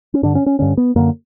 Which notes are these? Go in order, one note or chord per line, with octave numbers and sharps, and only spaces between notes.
C#4
G2 D3 D4
C#4
C#4
G2 D3 C#4
B3
F#2 D3 A#3